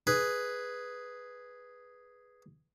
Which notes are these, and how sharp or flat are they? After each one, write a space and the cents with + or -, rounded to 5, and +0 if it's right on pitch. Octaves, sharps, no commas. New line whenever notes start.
G#4 +0 B4 +0